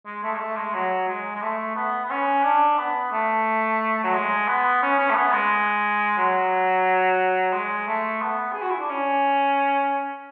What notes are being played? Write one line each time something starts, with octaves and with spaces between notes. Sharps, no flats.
G#3
A3
G#3
A3
G#3
F#3
G#3
G#3
A3
B3
B3
C#4
D4
B3
A3
F#3
G#3
B3
C#4
C#4
A3
B3
G#3
F#3
G#3
A3
B3
G#4
F#4
E4
D4
C#4